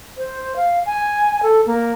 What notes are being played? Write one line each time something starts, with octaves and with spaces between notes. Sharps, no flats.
C5
F5
G#5
A4
A#3